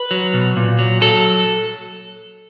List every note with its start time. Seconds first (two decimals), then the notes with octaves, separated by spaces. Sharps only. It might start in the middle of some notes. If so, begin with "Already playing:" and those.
Already playing: B4
0.11 F#3
0.34 B2
0.57 A#2
0.79 F#3
1.01 F#3 A4